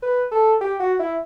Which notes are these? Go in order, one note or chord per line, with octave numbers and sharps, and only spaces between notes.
B4
A4
G4
F#4
E4